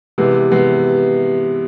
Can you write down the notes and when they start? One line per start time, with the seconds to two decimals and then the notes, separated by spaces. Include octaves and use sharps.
0.18 C3 E3 G#3 B3
0.52 C3 E3 G#3 B3